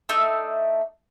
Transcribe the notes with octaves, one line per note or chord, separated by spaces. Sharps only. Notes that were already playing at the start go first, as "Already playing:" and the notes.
A3 D4 D#4 E6